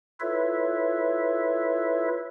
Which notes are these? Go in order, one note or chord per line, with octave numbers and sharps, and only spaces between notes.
E4 F4 A4 B4 C#5 E5